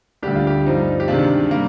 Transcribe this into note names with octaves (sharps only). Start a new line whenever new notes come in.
D2 D3 G3 D4 G4
F4
G4
G2 F3 C4 D#4
G4
C3 D#3 G#3 D4 F4
G3 A#3